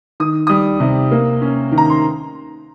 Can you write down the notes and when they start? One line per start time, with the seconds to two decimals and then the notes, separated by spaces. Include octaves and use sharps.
0.20 D#3 D#6
0.47 G3 D#6
0.80 C3
1.11 A#3
1.42 C#4
1.72 D#3
1.78 A#5
1.90 C6